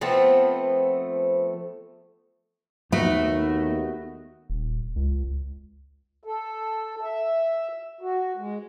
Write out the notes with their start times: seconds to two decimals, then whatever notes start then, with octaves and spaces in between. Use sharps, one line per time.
0.01 F3 A3 B3 C4
2.92 D#2 A3 B3 D#4 F#4
4.50 D#1
4.96 C#2
6.24 A4
7.01 E5
8.01 F#4
8.37 G#3